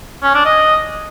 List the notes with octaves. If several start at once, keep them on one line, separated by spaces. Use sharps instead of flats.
C#4
D4
D#5